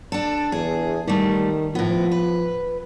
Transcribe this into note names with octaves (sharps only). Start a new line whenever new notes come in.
D4 A4
E2 G#4
D#3 G3 A3
A2 F3 B3
B4